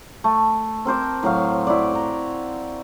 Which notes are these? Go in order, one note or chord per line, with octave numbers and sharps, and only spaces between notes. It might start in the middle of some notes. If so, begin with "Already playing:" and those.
A3
C4 A#4 C5 D6
A2 F#3 F5
E4 F#4 D5
A#5 C6